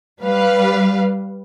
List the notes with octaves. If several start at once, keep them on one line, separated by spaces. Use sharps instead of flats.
G3 B4 F5